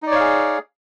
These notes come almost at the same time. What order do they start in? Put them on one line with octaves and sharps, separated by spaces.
D#4 D5 C#5 F5 G#4